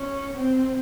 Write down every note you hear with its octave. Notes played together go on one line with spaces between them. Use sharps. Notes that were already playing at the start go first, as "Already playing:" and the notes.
Already playing: C#4
C4